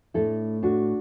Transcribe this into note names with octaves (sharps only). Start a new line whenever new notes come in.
A2 A3 D4 E4 A4
D4 F#4